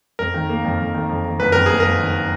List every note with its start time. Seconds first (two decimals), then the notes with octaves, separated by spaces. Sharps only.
0.19 F2 A#4
0.34 D#3
0.49 A#3
0.64 F2
0.80 F2
0.95 D#3
1.09 F2
1.24 D#3
1.39 F#1 B4
1.52 F2 A#4
1.66 A#3 G#4
1.80 F2 A#4
1.99 D#3